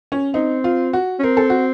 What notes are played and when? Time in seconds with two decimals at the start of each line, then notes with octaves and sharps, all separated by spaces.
0.12 C#4
0.34 C4 D#4
0.64 F4
0.93 F#4
1.19 C#4
1.23 C4 A#4
1.37 A4
1.50 F#4